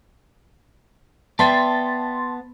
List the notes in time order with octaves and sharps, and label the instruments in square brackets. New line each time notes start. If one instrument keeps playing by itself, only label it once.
[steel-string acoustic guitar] B3 [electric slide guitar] D5 E5 G5 [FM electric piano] A5 C6 A6